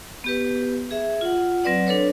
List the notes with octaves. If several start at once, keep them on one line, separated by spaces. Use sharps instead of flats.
B3 G4 B4
G#4 E5
F4 F#5
F#3 C4 B4 D5 F#5
D4 A4 B4 C#5